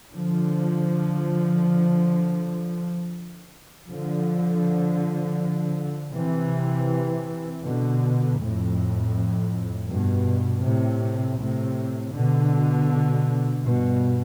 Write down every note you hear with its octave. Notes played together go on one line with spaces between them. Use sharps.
D3 F3
D3 F3
C3 E3
B2 D3
F2 A2
G2 B2
A2 C3
A2 C3
B2 D3
G2 B2